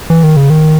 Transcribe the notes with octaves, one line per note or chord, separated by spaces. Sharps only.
E3
D#3
C#3
D#3